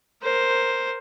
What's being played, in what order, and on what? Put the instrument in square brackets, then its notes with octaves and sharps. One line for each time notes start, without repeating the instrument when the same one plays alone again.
[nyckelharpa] A#4 C5